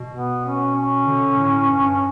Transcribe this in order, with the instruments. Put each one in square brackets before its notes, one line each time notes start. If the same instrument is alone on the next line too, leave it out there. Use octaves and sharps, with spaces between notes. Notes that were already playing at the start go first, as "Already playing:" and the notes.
Already playing: [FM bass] B2
[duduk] B3
C#4
C#4
[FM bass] D3
A2
G2